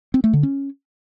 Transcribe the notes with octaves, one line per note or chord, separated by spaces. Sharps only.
C4
A3
D3
C#4